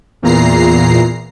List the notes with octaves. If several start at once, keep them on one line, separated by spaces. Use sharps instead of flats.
E2 A#2 A#5 C7